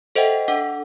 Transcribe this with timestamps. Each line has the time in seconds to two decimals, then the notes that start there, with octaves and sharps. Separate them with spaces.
0.15 A4 C5 D#5 E5 F#5 G5
0.48 D4 A4 F#5 D6